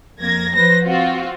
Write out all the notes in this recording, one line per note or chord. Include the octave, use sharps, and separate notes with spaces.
F2 A#3 G#6 A#6
F3 B4 C5 A#6
C4 F4 F#4